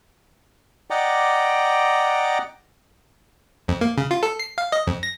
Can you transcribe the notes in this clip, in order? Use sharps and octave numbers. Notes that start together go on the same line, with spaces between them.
D5 D#5 F#5 G5 A#5 D6
F2
A#3
C#3
F4
A4
C7
F5
D#5
F2
A#6